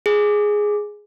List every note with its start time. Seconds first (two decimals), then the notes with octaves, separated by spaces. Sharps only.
0.06 G#4